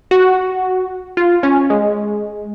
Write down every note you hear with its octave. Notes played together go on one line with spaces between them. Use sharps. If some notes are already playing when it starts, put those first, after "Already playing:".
F#4
F4
C#4
G#3